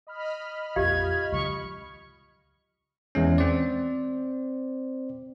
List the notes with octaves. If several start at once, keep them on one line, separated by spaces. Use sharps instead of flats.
D#5 B5 F6
A#1 F2 F4 G4 F5 G#6
C#2 C#3 F#3 C#6
E2 G#3 C#4
C4 C5 D5